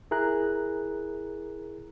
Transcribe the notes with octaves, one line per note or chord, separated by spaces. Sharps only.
E4 G#4 A#4 A#5 F#6